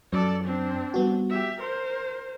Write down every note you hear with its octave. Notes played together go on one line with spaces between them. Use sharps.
F#2 A4 D5
C4 D4
G3 B3 F#4
G4 E5
A#4 C5 C6